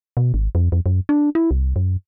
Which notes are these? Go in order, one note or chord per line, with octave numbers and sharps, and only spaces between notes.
B2
G#1
F2
F2
F#2
D4
E4
C2
F#2